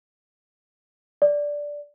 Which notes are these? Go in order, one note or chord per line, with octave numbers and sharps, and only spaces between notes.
D5